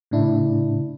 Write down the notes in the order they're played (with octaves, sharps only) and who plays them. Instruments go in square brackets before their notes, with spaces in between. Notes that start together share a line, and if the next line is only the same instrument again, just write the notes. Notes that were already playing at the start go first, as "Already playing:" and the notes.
[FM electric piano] A2 C#3 D4 E4